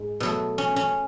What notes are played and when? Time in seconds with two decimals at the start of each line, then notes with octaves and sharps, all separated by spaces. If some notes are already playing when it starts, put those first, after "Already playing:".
Already playing: G#2 G#3
0.20 B2 F#3 A3
0.58 C#4
0.76 C#4